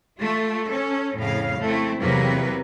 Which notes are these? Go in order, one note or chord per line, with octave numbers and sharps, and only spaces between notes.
A3 F4
C#4 A4
F2 A2 C#3 F5
A3 C4 E4
E2 C3 F#3 A#3 A#4 B4